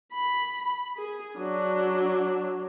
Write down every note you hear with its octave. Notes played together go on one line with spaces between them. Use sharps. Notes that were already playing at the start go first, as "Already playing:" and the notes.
B5
G#4
F#3 D4